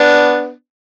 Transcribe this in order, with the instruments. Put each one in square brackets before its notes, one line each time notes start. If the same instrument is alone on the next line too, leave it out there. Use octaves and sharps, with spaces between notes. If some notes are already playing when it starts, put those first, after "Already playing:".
Already playing: [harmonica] B3 D4